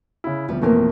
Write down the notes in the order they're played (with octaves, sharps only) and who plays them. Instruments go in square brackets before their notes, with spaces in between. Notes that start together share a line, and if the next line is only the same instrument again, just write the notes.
[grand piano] C#3 E4
[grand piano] D2 B2 [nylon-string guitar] F3 G3 C4
[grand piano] A1 F2 B2 [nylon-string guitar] A3 A#3 A#4